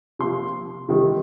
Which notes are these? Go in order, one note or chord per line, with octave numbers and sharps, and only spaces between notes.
C3 F3 A#3 C6
C3 D#3 G3